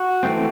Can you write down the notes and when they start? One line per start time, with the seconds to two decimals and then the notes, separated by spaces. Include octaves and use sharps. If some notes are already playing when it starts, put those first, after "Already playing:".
Already playing: F#4
0.23 E3 A3 C4